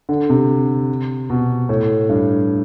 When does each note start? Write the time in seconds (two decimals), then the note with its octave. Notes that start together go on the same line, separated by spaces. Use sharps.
0.09 D3
0.29 C3
1.30 B2
1.69 A2
2.09 G2